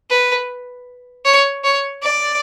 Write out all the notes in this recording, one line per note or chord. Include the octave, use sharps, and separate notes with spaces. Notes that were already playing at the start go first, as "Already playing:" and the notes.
B4
C#5
C#5
D5